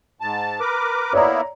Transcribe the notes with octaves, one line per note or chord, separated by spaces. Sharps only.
G#2 A5
A#4 B4 D6
A#3 B3 E4 C#5 D5 A#5